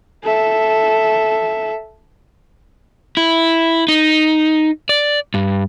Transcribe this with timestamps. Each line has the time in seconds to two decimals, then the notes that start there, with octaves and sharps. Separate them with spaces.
0.23 A4 E5
3.17 E4
3.88 D#4
4.89 D5
5.34 G2